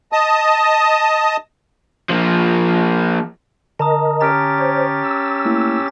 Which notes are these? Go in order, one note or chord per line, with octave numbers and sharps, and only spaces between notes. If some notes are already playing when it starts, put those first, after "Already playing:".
D#5 A5 D#6
F3 A#3
D3 A#4 D#5 A5 A#5 D#6
C#4 G4 A#5 F6 A6 D7
C5 C#5
E6
A3 A#3 E4